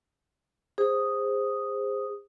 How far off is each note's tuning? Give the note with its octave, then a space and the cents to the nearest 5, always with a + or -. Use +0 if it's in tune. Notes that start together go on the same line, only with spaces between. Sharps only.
G#4 -25 C5 +0 D#6 +0